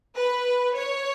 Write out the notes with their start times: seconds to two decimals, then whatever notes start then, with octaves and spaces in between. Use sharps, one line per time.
0.15 B4
0.76 C#5